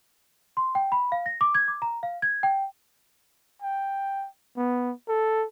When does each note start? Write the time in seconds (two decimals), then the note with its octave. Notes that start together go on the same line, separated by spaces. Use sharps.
0.57 C6
0.75 G5
0.92 B5
1.12 F5
1.26 A#6
1.41 D6
1.55 G#6
1.68 D6
1.82 A#5
2.03 F5
2.22 G#6
2.43 G5
3.62 G5
4.57 B3
5.09 A4